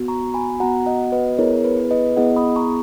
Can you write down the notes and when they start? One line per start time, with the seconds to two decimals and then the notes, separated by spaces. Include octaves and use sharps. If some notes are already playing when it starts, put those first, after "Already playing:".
Already playing: B3 F#4
0.08 A#5 C#6
0.34 G#5 B5
0.60 B3 F#4 F#5 A#5
0.86 D#5 F#5
1.12 B4 D#5
1.38 B3 E4 G#4 A#4 C#5
1.64 B4
1.91 B4 D#5
2.17 B3 E4 G#4 D#5 F#5
2.36 B5 D#6
2.56 A#5 C#6